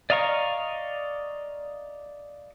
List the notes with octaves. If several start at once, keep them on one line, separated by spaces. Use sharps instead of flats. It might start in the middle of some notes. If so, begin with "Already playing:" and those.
D5 D#5 F5 A#5 C#6